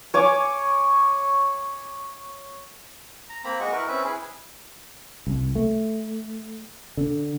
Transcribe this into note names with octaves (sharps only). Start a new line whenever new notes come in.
C#5 G#5 D6
A#5
A#3 C4 A#5 B5
G#3 F#4 D#5 C#6
E4 A#4 B4 C#6
C4 C#4 B4 E5
E4 G#4 B4
C2
A3
D3